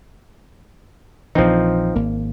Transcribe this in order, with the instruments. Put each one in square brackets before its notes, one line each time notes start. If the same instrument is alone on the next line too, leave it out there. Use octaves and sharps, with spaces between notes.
[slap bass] A#1 E3 [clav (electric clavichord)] F3 C4 D#4
[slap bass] G#1 A#3